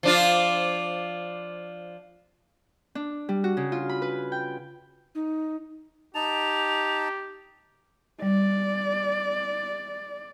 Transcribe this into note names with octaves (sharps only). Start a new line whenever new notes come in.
F3 D4 F4
D4
G3
F#4
C#3
F4
B5
B4
G5
D#4
D#4 G4 A5 F7
G3 D5